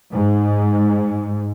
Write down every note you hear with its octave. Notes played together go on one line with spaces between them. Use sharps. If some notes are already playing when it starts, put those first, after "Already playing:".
G#2